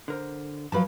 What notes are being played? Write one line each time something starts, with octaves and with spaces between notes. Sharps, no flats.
D3 A#4 C5
F3 F#3 B4 F5 A5